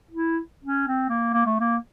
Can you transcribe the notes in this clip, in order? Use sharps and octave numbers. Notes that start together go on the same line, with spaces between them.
E4
C#4
C4
A#3
A#3
A3
A#3